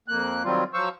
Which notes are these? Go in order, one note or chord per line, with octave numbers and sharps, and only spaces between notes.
F2 A#3 F#6
D#3 F#3 G3 C4 F4
F3 F#3 C5 F5 C#6 E6